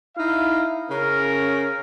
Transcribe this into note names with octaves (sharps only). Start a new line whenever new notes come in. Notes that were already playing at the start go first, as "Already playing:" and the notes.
D#4 E4 F5
C#3 C#4 A#4